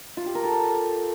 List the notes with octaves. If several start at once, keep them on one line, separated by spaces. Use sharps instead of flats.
F4
G4
A#4
A4